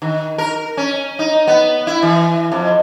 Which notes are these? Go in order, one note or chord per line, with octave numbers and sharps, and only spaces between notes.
D#3
A#4
C#4
D#4
B3
E4
E3
F2